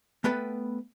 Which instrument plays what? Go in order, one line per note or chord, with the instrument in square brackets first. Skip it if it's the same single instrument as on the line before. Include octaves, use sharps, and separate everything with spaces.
[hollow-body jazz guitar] A3 B3 B4 G5 A5